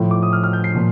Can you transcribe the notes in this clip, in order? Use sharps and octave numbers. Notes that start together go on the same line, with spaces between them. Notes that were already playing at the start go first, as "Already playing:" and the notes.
Already playing: A2 F3
D6
D#6
F6
F6
G6
C7
A#2 F3